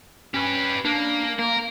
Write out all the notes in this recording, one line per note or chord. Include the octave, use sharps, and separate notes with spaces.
C#4 G4 B4
A#3 D4
A#3 A#4